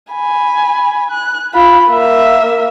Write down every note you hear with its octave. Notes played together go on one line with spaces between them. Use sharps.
G#5 B5
F#6
F4 B5
A#3 E5